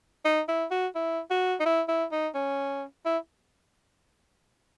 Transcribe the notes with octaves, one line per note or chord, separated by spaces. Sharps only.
D#4
E4
F#4
E4
F#4
D#4
E4
E4
D#4
C#4
E4